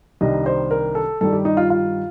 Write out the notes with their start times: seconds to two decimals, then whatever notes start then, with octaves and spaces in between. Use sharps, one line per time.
0.21 C2 C3 D#3 G3 D4 D#5
0.46 C5
0.71 A#4
0.95 A4
1.21 G2 D#3 G3 A4
1.33 G4
1.45 D#4
1.57 F4
1.70 F4